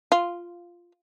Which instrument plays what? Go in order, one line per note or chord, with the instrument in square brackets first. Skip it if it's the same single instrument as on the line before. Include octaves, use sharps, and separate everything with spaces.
[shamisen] F4